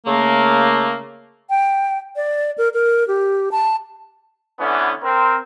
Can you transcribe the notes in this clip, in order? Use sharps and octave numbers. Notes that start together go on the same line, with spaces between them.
C#3 A3 A#3
G5
D5
A#4
A#4
G4
A5
D3 E3 B3 C#4
C4 A#4